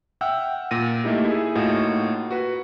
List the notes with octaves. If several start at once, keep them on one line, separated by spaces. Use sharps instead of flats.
E5 F#5 G5 E6 F6
A#2 A#6 D#7
A3 A#3 D#4 E4 G4
E4 G#4
A2 A#3 D#4 F4 F#4
F#4 B4